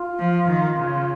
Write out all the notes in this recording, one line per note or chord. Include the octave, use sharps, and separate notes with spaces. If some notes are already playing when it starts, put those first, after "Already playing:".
Already playing: F4
F3
D#3
C#3